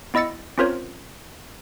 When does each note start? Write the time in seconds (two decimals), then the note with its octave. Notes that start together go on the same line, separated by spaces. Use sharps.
0.14 B3 E4 D#5 E6 A6 C#7
0.58 C4 C#4 F4 A#4 C5 C#5